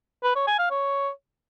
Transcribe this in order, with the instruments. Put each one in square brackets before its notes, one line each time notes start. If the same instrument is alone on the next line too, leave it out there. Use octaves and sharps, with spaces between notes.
[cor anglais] B4
C#5
G#5
F5
C#5